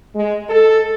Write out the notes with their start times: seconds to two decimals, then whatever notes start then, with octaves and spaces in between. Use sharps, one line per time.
0.15 G#3
0.49 A4